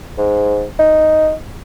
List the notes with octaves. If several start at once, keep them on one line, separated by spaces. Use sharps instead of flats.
G#2
D#4